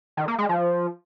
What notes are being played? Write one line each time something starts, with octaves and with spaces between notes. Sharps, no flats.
D#3
A#3
G#3
F3